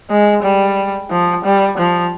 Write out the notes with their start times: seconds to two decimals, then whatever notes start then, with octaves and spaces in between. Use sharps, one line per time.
0.10 G#3
0.43 G3
1.10 F3
1.45 G3
1.78 F3